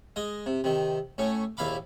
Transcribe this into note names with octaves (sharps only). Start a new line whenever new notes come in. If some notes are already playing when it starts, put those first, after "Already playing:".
G#3 D#5
C3
C3 D#3
A2 A3 C#4
A#1 D#2 E4 F5 B5 D6